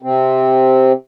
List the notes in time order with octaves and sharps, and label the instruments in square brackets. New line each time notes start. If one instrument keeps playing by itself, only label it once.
[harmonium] C3 C4